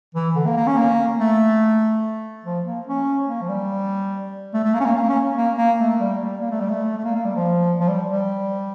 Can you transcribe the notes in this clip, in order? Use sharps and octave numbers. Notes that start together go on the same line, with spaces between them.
E3
D3
A#3
A#3
C#4
A#3
A3
F3
A#3
C#4
A#3
F3
G3
A3
A3
A#3
C#4
A#3
A#3
C#4
A#3
A#3
A3
G3
G3
A#3
A3
G3
A3
A3
A#3
A#3
G3
F3
F3
G3
G3